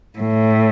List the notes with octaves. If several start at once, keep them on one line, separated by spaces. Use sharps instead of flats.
A2